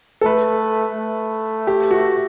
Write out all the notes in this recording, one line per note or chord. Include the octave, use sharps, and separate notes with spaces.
A4
A3 B4
A3
G4
F#4